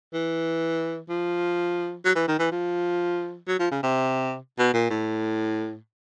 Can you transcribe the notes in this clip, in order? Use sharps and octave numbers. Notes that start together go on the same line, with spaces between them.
E3
F3
F#3
E3
D#3
E3
F3
F#3
F3
C#3
C3
B2
A#2
A2